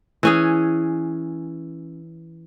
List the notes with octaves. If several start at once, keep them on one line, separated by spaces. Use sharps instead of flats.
E3 C#4 G#4